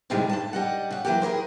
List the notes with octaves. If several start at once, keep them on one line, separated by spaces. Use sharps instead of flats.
A2 C3 D#3 F3 G3 G#3
G2 A5
G3 D#5 F#5
C#3 F#5
E3 F#3 A#3 G4
E4 G#4 A#4 C5